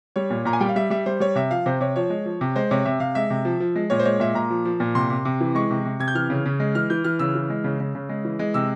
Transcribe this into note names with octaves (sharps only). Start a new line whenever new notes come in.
G3 C#5
A#2
A#2 A#5
G#5
G3 G5
F5
G3 E5
G3 E5
G3 C5
G3 C#5
C3 E5
F3 F5
C3 C5
C3 C#5
F3 C#5
G#3
F3
C3
G#3 C5
C3 C#5
C3 E5
C3 F5
G#3 E5
C3
F3
F3
G#3
A#2 C#5
C5
G#3 C#5
A#2 E5
A#2 A#5
F3
F3
A#2
C3 C6
C3
C3
E3
G#3 C#6
C3
C3
C3 G#6
G6
E3 F6
C#3
C#3
G#3
E3 F6
E3 G6
E3 F6
C#3 E6
E3
G#3
C#3
C#3
C#3
G#3
E3
G#3
C3 E6